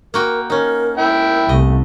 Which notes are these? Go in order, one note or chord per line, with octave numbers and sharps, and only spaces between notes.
A#3 F#4 A#4 G5
C#4 D#4 A#4
E4 A#4 G5
C2 A3 D#5